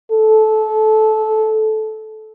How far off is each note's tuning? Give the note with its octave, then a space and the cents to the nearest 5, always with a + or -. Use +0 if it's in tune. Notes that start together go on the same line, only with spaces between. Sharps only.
A4 -20